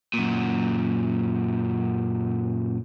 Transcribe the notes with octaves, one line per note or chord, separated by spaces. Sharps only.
F#2 A#2